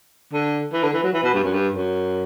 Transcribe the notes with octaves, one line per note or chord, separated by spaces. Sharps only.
D3
E3
D3
E3
F#3
E3
B2
G2
F#2
G2
F#2